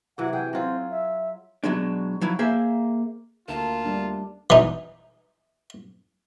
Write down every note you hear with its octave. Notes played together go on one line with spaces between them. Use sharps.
C3 E3 F#3 F#5
G#4 G5
F#3 C4 F4
E5
B2 F#3 G#3 D4
F3 F#3 E4
A#3 G#4 C5 E5
D2 A#3 F4 A4 A5
G3 A3 D4
E3 D#4